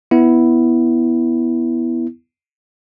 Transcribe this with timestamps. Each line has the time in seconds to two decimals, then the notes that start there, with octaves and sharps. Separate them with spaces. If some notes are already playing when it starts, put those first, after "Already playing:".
0.11 B3 E4